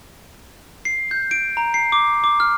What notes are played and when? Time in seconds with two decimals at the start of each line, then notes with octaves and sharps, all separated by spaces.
0.85 C7
1.11 G6
1.31 D7
1.57 A#5
1.74 C7
1.92 D6
2.24 D6
2.40 F6